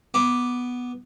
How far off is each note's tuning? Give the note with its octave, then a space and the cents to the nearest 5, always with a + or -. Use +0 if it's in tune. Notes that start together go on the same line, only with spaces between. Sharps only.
B3 +0 D6 +0